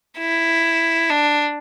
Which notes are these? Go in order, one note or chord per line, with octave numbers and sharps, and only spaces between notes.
E4
D4